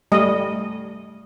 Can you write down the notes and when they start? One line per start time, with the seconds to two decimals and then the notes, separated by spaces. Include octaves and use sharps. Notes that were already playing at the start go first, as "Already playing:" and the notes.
0.12 G3 A3 D#5